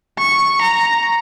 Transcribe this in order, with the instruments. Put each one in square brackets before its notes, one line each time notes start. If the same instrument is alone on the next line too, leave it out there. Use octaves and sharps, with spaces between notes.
[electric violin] C#6
A#5